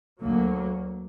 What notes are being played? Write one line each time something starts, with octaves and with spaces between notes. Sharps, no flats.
D2 F#3 A#3